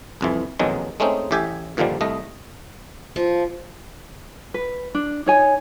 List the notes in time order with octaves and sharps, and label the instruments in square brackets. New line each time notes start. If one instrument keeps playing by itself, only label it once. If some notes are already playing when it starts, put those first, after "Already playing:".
[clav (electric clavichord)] C2 F2 E3
A#1 F2 B2 D#3 F#3 G#3
G#3 A3 C4 C#4 D#4
A1 A2 G4 E5 G#5
G2 A#2 D3 D#3 F3 G3
C2 A3 D#5
[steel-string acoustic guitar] F3
[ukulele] B4
D4
D#4 C#5 G#5